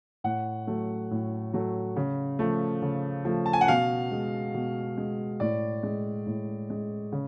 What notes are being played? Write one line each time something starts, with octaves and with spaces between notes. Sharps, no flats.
A2 F#5
F#3 A3
A2
F#3 A3
C#3
F3 A3
C#3
F3 A3
A5
G#5
F#5
B2 F5
G#3
B2
G#3
A2 D5
G#3
A2
G#3
C#3